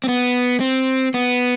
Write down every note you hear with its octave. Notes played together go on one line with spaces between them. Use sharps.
C4
B3
C4
B3